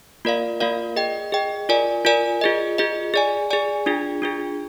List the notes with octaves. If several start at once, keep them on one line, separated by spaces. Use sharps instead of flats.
A#3 F4 A#4 D5 F5
A#3 F4 A#4 D5 F5
G#4 D#5 G5
G#4 D#5 G5
F4 A#4 D5 G#5
F4 A#4 D5 G#5
F4 G#4 D#5
F4 G#4 D#5
G#4 D5 G#5
G#4 D5 G#5
D4 F4 G#4
D4 F4 G#4